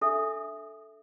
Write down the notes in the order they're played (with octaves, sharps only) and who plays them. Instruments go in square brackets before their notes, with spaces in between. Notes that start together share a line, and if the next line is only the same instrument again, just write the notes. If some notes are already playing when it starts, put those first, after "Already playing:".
[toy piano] D4 A4 E5 D#6